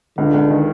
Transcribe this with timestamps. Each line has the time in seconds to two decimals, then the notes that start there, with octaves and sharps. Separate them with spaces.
0.18 C#2 D3
0.34 C#2
0.50 D#3